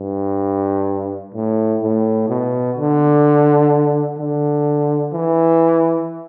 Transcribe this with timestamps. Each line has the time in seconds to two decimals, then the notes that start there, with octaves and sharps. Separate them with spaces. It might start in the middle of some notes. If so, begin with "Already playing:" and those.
Already playing: G2
1.35 A2
1.82 A2
2.29 B2
2.77 D3
4.19 D3
5.13 E3